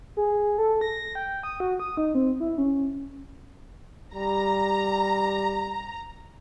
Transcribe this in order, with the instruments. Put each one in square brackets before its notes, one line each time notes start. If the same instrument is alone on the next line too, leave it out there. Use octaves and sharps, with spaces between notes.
[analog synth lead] G#4
A4
A#6
G5
D#6
F#4
D#6
D#4
C4
E4
C#4
[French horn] G3 [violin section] A#5